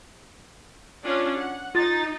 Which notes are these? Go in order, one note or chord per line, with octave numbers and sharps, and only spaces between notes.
C#4 D4 F4
F#5
D#4 F4 A6